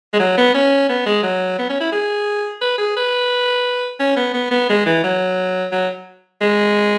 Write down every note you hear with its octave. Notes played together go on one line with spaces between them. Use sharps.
G#3
F#3
B3
C#4
B3
G#3
F#3
B3
C#4
E4
G#4
B4
G#4
B4
C#4
B3
B3
B3
G#3
E3
F#3
F#3
G#3